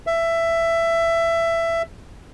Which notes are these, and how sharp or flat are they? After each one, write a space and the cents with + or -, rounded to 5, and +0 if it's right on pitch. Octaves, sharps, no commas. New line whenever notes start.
E5 +15